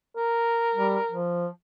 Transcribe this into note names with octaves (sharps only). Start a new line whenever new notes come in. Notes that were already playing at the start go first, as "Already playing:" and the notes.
A#4
G3
F3